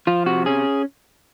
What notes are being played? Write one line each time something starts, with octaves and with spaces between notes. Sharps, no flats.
F3 F4
C3 F#4
C#4 G#4